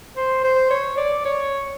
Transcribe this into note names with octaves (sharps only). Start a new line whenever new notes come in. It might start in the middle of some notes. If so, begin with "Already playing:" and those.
C5
C5
C#5
D5
C#5